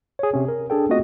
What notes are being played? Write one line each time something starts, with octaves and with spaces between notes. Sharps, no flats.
G#4 C#5
C3 C#4
A#4
D4 G#4 A4 G5
A3 B3 C4 F4 F#4 D#5